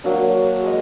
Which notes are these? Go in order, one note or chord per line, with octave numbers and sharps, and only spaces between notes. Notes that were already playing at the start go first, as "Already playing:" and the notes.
F#3 A#3 D4
G#3 D#5